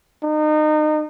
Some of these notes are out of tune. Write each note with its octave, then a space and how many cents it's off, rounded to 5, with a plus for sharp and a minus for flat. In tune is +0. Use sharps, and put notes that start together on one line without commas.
D#4 -30